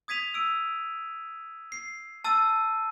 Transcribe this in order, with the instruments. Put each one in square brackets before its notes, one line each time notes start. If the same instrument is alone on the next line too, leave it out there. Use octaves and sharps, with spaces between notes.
[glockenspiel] D#6 G#6 B6 D#7 F7
E6 D7
C7
A5 E6 A6 D#7